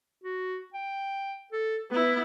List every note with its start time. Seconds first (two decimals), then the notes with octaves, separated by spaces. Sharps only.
0.24 F#4
0.74 G5
1.52 A4
1.91 B3 E4 B4